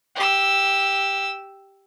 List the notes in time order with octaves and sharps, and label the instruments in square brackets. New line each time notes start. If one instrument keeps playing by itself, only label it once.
[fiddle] G4 E6